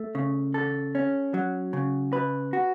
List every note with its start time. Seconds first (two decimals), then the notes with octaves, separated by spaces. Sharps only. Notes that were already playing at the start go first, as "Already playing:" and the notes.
Already playing: A3
0.15 C#3
0.54 A4
0.95 C#4
1.34 F#3
1.73 C#3
2.13 B4
2.53 F#4